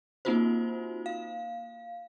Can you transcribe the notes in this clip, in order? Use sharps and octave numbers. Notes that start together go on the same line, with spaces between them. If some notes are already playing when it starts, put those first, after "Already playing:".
A#3 C4 D#4 F4 F#4 C5
F5